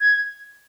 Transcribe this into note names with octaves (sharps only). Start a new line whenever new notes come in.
G#6